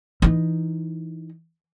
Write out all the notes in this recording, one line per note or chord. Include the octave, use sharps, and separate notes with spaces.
E3 D#4